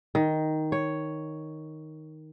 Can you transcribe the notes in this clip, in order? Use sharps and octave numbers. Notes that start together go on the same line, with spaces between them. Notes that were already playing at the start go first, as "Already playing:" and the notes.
D#3
C#5